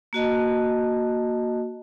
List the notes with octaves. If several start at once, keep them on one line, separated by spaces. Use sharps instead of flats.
A#3 F#4 D#5 A5